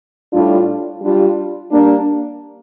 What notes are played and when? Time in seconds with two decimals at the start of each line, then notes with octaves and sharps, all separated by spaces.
0.32 A2 G3 D4 F4
1.01 G3 D4 F4
1.70 G3 A#3 D4